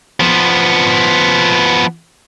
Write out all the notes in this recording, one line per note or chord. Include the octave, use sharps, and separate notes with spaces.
F3 B3